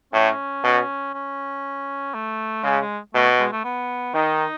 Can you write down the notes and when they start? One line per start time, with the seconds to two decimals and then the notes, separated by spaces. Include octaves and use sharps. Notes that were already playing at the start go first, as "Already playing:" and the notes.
0.13 A2 C#4
0.64 B2
1.14 C#4
2.14 A3
2.63 C#3 G#3
2.81 G#3
3.14 B2 A3
3.39 G#3
3.52 A3
3.64 B3
4.14 D#3 D#4